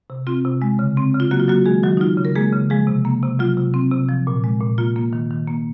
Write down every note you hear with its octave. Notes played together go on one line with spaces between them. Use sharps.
C3
C4 F4
C3
G#3
C#3
C4
C#3
F4
F#3 A#3 F#4
F4
F#3 A#3 F#4
D#3 G#3 G#4
D#3 F#3 F#4
D#4
F#3 F4
C#3
A#4
G#3 A#3 G#4
C#3
F3 G#3 G#4
C3
A#3
C3
F#3 F4
C3
C4
C3
F3
A#2
G#3
A#2
A#3 F4
A#3
D#3
D#3
A#3